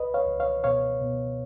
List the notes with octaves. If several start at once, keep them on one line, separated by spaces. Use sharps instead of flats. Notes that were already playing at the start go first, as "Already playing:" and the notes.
Already playing: C#2 B4 D#5
C#5 F5
C#2
C#5 F5
B2 C#5 F5
B2